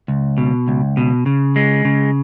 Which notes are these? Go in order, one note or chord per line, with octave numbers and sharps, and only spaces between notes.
C#2
B2
C#2
B2
C#3
G#3
C#3